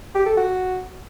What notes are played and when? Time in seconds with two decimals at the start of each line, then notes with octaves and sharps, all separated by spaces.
0.14 G4
0.26 A4
0.37 F#4